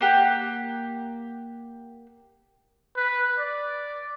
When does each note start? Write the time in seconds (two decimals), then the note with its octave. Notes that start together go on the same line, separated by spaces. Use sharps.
0.01 A#3 G4 F#5
2.96 B4
3.38 D5